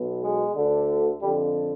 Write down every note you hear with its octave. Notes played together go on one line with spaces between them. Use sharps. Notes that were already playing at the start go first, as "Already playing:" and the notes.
Already playing: B1 B2
G#3
D2 D3
F2 D3 G3